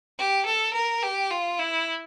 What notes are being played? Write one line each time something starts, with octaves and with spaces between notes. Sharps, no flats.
G4
A4
A#4
G4
F4
E4